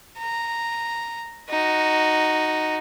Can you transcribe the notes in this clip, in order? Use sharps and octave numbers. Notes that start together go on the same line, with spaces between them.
A#5
D#4 F#4